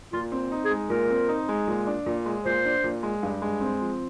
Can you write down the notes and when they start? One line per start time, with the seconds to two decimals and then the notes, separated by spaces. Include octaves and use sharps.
0.13 A#2 F4
0.32 C4
0.52 D#4
0.65 G#4
0.70 G#3
0.90 A#2 A#4
1.10 C4
1.28 D#4
1.49 G#3
1.67 A#2
1.87 D4
2.06 A#2
2.26 G#3
2.45 A#2 C5
2.65 D4
2.84 A#2
3.03 G#3
3.23 G2
3.42 G#3
3.61 C4
3.81 F3